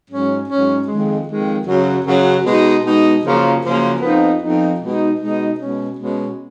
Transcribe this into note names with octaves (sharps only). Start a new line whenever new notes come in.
G#2 F#3 C#4
G#2 F#3 C#4
F2 D#3 G#3
F2 D#3 G#3
F#2 C#3 F#3
F#2 C#3 F#3
B2 G#3 D#4
B2 G#3 D#4
F#2 C#3 F3 A#3 C#4
F#2 C#3 F3 A#3 C#4
F2 F3 B3 D#4
F2 F3 B3 D#4
B2 G#3 D#4
B2 G#3 D#4
B2 G#3 C#4
B2 G#3 C#4